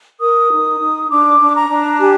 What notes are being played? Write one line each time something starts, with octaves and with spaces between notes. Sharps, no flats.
A#4 D#6
D#4
D#4
D4 D6
D4
A#5
D4
G4 G#5